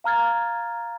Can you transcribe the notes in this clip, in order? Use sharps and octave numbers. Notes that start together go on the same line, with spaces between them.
F5 A#5 F6 G#6 A6